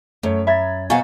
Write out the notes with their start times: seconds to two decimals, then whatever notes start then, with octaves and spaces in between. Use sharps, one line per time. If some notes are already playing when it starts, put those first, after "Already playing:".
0.23 F#2 A3 C#5
0.47 E5 A#5 B5 G#6 A6
0.90 B2 F#4 C5 F5 G#5 A#5 C#6 A6